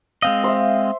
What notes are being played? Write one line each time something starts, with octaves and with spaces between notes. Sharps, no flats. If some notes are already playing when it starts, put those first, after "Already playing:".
G#3 C4 D#5 F5
C5 E5